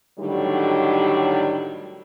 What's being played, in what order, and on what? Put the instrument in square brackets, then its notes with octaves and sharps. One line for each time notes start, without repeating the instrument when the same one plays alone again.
[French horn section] A2 D3 D#3 F#3 G3